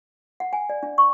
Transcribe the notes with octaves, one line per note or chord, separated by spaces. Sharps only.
F#5
G#5
D5
D4
C#6